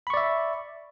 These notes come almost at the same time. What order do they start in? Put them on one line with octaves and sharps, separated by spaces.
B5 C#6 D5 E5